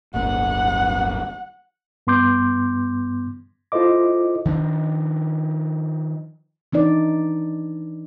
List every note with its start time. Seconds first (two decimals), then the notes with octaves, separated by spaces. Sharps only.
0.14 D1 G1 A#3 F#5
2.07 G2 B3 C6 D6 G6
3.72 E4 F4 A4 C5 D#5 D6
4.45 D#3 F3 D4
6.73 E3 D4 D#4 D5